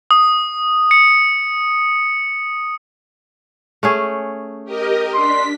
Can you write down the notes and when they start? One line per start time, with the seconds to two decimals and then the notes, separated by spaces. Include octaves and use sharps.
0.11 D#6
0.91 C#7
3.83 A3 C#4 G#4
4.64 G4 A#4 D#5
5.14 D4 C6 B6